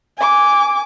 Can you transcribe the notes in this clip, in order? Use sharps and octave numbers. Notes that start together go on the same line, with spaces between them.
G#5 D6